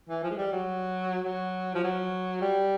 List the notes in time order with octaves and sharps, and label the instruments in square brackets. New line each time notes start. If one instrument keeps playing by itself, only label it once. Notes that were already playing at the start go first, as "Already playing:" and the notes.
[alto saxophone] E3
F3
G#3
G3
F#3
F#3
F3
F#3
G3